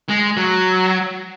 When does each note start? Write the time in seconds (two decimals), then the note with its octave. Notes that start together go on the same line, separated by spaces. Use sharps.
0.09 G#3
0.37 F#3